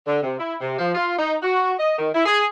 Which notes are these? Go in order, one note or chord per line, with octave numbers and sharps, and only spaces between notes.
D3
C3
E4
C3
F3
F4
D#4
F#4
D#5
D#3
E4
G#4